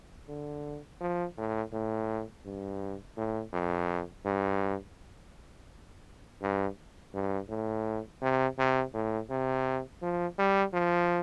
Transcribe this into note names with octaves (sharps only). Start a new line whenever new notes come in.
D3
F3
A2
A2
G2
A2
F2
G2
G2
G2
A2
C3
C3
A2
C3
F3
G3
F3